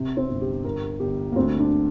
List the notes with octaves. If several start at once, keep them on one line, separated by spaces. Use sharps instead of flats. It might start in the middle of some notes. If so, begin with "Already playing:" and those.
Already playing: C3
C4
G1
G4
G1 A#4
G1 G4
A#3
D2 C4
D4